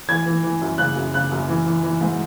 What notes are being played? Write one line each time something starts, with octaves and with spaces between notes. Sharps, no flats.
E3 G#6
E3
E3
F#2
C#3 F#6
F#2
C#3 F#6
F#2
E3
E3
E3
G#2